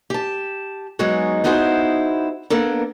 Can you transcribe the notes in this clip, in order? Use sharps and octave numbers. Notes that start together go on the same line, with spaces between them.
G4 A5
F#3 G#3 B3 D#4 F#4 G#4
B3 D#4 E4 F#4 G#4 C5
A#3 B3 D4 A4 A#4